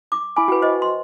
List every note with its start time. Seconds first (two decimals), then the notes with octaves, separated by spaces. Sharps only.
0.12 D6
0.36 E4 G#5 B5 D6
0.48 F#4 B4 G5
0.62 C5 D#5
0.82 C6